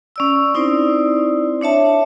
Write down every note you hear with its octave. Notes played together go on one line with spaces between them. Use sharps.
C#4 D5 E6
C4 D#4 E4 C5 D5
D4 C#5 E5 A5